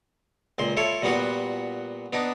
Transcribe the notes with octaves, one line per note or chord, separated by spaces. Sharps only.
C#2 A#2 C6
E4 F4 A4 C#5
A#2 G3 B3 F4 F#4
B3 D4 D#4